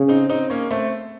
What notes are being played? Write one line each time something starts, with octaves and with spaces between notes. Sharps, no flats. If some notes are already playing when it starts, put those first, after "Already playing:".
Already playing: C#3
C4 D#4
C4 D#4
A#3 C#4
A3 C4